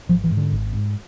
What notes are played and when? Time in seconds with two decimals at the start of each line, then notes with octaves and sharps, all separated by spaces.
0.09 G#1 F3
0.24 E3
0.31 G#2
0.37 D3
0.52 G#1
0.73 G#2